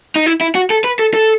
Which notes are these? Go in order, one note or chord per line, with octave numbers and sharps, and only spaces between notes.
D#4
E4
E4
F#4
A4
B4
A4
A4